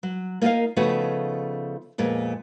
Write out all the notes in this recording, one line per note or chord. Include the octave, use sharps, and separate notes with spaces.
F#3
A#3 D#4 F4 G4 A#4 F5
C#3 F3 A3 B3 D#4 F#4
F2 A#2 G#3 B3